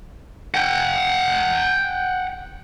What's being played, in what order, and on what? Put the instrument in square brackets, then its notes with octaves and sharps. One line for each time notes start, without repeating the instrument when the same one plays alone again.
[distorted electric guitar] F#5 G5